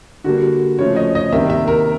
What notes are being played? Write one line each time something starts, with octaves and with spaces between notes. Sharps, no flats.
D3 G3 A#3 F#4
C#3 F3 A3 C#5
D#5
D#5
C3 D#3 G3 A#3 E5
E5
A#4